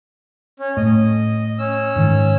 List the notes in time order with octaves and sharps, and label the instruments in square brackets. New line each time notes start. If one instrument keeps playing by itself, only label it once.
[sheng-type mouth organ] C#4
[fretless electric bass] A2 [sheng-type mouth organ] D#5
[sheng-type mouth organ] C#4 E6
[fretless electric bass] G#2 D#3